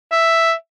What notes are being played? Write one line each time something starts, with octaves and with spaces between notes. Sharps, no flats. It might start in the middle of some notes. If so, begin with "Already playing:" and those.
E5